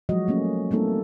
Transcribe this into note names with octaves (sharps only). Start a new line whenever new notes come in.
F3 F#3 G#3 F#4 D#5
A3 A#3 C#4
G3 A3 A#3 C4 D#4 A4